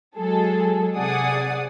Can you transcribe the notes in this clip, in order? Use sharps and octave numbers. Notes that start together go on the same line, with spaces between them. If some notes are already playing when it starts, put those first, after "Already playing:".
F#3 G#3 G#4 A4
C3 G#4 D5 F#5 D#6